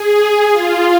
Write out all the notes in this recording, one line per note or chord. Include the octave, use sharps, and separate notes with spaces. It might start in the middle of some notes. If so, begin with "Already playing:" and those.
Already playing: G#4
F4